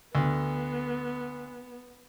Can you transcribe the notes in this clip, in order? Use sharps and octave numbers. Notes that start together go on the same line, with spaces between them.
D2 B3